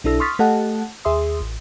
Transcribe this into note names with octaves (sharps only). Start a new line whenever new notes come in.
B1 D4 E4 A4 E6 A#6
C6 C#6 D#6 F6 A6 B6
A3 G4 A4 D#5 F#5 A5
D#2 G#4 E5 C6 D#6
A1